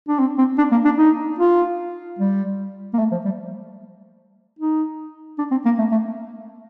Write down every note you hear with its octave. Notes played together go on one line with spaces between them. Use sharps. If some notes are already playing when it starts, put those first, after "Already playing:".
D4
C4
C4
D4
A#3
D4
D#4
F4
G3
A#3
A3
F3
G3
D#4
D4
C4
A#3
A3
A3